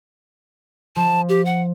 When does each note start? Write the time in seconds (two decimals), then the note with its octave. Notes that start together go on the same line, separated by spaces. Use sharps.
0.96 F3 A5
1.29 G4
1.45 F#5